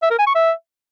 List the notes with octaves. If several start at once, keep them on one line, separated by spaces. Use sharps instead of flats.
E5
A#4
G#5
C#6
E5